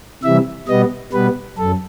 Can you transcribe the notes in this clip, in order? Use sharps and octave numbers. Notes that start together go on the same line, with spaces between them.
C3 E3 G3 E5
B2 G3 B3 D#5
B2 G3 B3 B4
F#2 A4